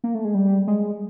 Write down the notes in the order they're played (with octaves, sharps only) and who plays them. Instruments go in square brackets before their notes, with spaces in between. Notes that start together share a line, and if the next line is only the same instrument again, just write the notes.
[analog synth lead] A#3
A3
G#3
G3
G#3